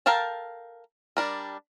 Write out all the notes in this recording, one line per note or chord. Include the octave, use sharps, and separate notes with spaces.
A4 A#4 F5 G5 A5
G3 D4 A#4